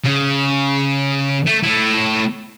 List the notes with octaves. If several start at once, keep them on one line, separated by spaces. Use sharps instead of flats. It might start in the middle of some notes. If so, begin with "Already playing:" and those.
C#3
A3
A3 E4